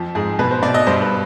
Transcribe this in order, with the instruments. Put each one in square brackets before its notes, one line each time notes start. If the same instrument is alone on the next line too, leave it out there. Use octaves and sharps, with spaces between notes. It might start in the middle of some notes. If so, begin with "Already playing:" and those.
Already playing: [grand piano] F2 F3
G#2 G#4
B2 B4
C5
B2 D5
D#5
G2 C5
B4